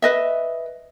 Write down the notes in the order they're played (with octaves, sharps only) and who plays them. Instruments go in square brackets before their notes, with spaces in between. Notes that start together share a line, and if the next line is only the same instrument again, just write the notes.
[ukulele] B4 D#5 E5